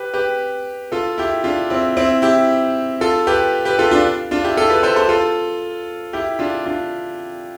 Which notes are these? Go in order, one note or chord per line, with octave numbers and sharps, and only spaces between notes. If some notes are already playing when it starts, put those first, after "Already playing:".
Already playing: G4 B4
G4 B4
F4 A4
E4 G4
D4 F4
C4 E4
C4 E4
E4 G4
F4 A4
G4 B4
G4 B4
F4 A4
D4 F4
D4 F4
E4 G4
F4 A4
G4 B4
A4 C5
A4 C5
F4 A4
E4 G4
D4 F4
D4 F4